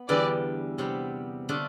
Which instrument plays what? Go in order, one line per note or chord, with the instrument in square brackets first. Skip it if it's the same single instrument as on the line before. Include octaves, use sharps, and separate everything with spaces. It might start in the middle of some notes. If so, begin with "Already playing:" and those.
Already playing: [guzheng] B3
[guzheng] E2 D3 G3 [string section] B4 D5
[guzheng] C3 G3 B3
D3 A3 D4 F4